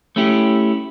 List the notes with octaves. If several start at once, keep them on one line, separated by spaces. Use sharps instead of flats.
A3 C#4 E4 G4